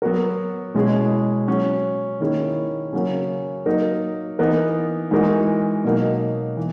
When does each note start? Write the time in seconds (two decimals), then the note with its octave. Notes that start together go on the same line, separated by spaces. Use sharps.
0.02 F#3 B3 F#4 A#4
0.74 B2 G#3 C#4 E4 G#4
1.47 F#3 C#4 F#4
2.20 D#3 A#3 C#4 E4 G#4
2.93 C#3 F#3 A#3 C#4
3.66 F#3 A#3 D#4 A#4
4.39 E3 B3 D#4 A#4
5.11 E3 G#3 D#4 F#4 A#4
5.84 B2 F#3 A#3 D#4
6.57 E3